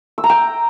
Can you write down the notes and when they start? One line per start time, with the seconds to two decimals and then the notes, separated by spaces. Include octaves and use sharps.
0.18 E6
0.24 A#5
0.30 G5